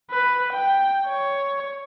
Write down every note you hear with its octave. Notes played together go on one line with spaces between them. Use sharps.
B4
G5
C#5